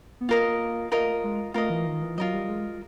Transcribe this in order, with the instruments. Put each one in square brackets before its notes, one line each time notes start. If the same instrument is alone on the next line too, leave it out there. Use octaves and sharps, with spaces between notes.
[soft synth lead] B3
[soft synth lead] A#3 [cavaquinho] F4 A#4 D#5
[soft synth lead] A3 [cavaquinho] F4 A#4 D#5
[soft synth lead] G#3
[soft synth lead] A3 [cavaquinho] F4 A#4 D#5
[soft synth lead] E3
D#3
E3
[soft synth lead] F#3 [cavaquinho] F4 A#4 D#5
[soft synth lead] G3
G#3